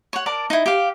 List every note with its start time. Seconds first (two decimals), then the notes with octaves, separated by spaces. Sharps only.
0.13 C#5 F#5
0.26 A#4 D5 A5
0.50 D#4 E4
0.66 G4 F5